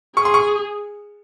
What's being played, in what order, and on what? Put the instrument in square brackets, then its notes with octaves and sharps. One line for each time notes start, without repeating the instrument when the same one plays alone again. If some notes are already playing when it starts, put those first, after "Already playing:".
[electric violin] G#4 [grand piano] C#6
[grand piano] C6
C#6